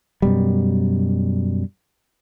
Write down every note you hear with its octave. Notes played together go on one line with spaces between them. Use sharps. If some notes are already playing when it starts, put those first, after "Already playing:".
F#2 B2 G3